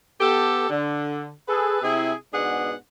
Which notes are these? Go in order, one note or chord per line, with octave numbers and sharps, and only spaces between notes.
B3 G4 A4
D3
G#4 A4 B4
C3 E4 G#4
G#2 B2 B3 D4 G#4 F#5